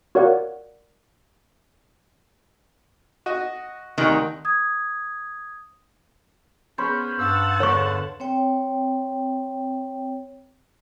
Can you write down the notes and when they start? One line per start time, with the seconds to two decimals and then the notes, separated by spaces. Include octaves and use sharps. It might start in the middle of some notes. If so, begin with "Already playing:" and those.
0.15 F#4 A#4 C#5 D5 F5 F#5
3.26 F#4 D#5
3.98 D2 C3 D#3
4.45 D#6 G#6
6.78 B3 C#4 G#4 C5 B5
7.19 G2 F#5 A5 E6
7.60 E2 G2 D3 C#5 C#6
8.20 C4 C#5 G5